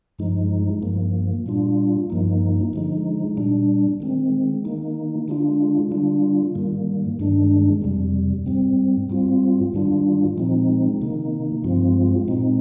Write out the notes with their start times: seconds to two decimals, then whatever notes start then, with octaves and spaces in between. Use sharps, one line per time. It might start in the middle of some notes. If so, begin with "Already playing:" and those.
0.19 G2 F3 G#3 D#4
0.82 G2 F3 A#3
1.46 A#2 G3 D4 F4
2.10 G2 F3 A#3 D#4
2.73 D3 F3 G#3 D#4
3.37 A#2 G3 D4
4.00 D#3 G#3 C4
4.65 D#3 A#3 D#4
5.28 D3 G#3 D4 F4
5.91 D3 G3 D4 F4
6.55 G#2 D#3 G3 A#3
7.19 G2 D#3 G#3 D4
7.82 F2 C3 G3
8.46 G#2 G3 C4
9.10 G#2 G3 C4 F4
9.74 G#2 D#3 G3 D4 F4
10.37 A#2 F3 G#3 C4 D#4
11.01 C3 D#3 A#3 D#4
11.64 G2 F3 G#3 C4 F4
12.28 A#2 G#3 C4 D#4